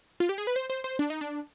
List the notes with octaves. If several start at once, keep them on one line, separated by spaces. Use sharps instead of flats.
F4
G4
G#4
B4
C5
C5
C5
D4
D#4
D4